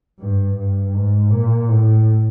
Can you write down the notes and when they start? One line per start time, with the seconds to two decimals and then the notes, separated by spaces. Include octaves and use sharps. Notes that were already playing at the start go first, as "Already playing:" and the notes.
0.18 G2
0.56 G2
0.94 G#2
1.31 A#2
1.68 A2